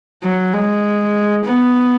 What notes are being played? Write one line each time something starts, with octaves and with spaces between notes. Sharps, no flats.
F#3
G#3
B3